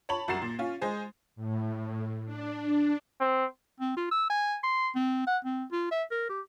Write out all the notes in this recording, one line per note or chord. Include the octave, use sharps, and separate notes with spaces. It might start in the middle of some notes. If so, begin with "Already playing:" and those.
C#5 A5 B5 F#7
C2 F#2 F#4 A6 C7 E7
A#2
C#4 F4
G#3 G#4 C5
A2
D4
C4
C4
F4
E6
G#5
C6
C4
F#5
C4
F4
E5
A#4
G4